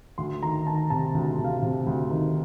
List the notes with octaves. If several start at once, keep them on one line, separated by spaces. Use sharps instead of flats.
D2 C6
D#3 A#5
D#3 A5
C3 A5
D2
C3
F5
C3
D2
D#3